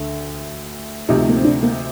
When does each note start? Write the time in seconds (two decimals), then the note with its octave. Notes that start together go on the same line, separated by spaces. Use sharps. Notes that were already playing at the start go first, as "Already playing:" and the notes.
Already playing: D2 D3 A3
1.08 D2 C3 F3 A3 D#4 G4
1.29 A#3
1.36 C4
1.44 D4
1.63 A#3